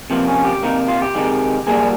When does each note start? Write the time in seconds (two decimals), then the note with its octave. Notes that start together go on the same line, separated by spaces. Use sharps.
0.10 C3 F3 A#3 C4
0.27 C#4
0.45 G4
0.62 C3 D#3 A#3 D#4
0.88 F4
1.02 G4
1.15 C3 D#3 G#3
1.67 A#2 G3 A#3 G#4